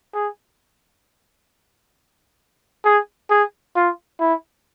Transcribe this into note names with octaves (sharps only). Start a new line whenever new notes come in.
G#4
G#4
G#4
F4
E4